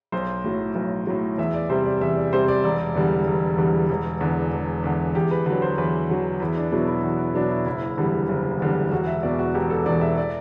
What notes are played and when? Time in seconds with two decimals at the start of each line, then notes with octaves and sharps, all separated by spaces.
0.12 B1 C5
0.44 A2 F#3
0.75 B1
1.07 A2 F#3
1.38 E2 E5
1.54 D5
1.70 C3 G3 C5
1.85 D5
2.01 E2 E5
2.17 D5
2.32 C3 G3 C5
2.48 D5
2.64 E1 D5
2.95 E2 D3 G3
3.27 E1
3.58 E2 D3 G3
3.89 E1
4.21 E2 D3
4.53 E1
4.84 E2 D3
5.15 E2 G4
5.31 B4
5.46 D3 F#3 B4
5.62 C5
5.78 E2 B4
6.10 D3 F#3
6.40 E2 E4
6.57 D4
6.72 B2 F#3 E4
6.87 E4
7.03 E2 F#4
7.19 E4
7.35 B2 F#3 D4
7.50 E4
7.66 F#1 E4
7.97 E2 D3 G3
8.29 F#1
8.60 E2 D3 G3
8.91 E1 F#4
9.07 E5
9.23 E2 B2 D5
9.39 F#4
9.54 E1 G4
9.70 A4
9.86 E2 B2 D5
10.01 E5
10.17 D5